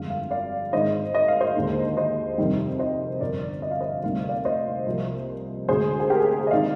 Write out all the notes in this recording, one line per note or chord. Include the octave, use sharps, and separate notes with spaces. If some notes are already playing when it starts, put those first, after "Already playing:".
Already playing: G1 F2 D3 G#3 F5
F5
D5 F5
G#2 D#3 G#3 D#4 C5 D#5
D#5
F5
C5 D#5
D#2 D3 G#3 D#4
C5 D#5
F2 C3 D#3 G3
C5 D#5
G1 F2 D3 A#4 D5
D#5
F5
C5 D#5
D2 C3 G3 A#3 D#4 F5
D5 F5
C5 D#5
C2 C3 F3 A#3
D2 D3 G#3 G#4 C5
G#4
G4 A#4
G#4
G4
G#4
D#5
D#3 G#3 C4 D#4 D5 F5